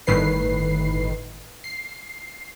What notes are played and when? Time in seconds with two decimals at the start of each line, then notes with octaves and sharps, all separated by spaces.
0.07 G1 A2 D#3 B4 C7
1.64 C7